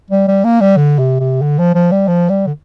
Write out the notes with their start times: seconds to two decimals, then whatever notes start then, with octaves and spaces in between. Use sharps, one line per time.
0.11 G3
0.28 G3
0.44 A#3
0.61 G3
0.77 D3
0.99 C3
1.20 C3
1.42 D3
1.59 F3
1.75 F3
1.91 G3
2.08 F3
2.29 G3
2.47 D3